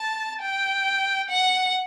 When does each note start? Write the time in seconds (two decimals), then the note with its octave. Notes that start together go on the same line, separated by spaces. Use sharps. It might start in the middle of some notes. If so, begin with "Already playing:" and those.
Already playing: A5
0.41 G5
1.30 F#5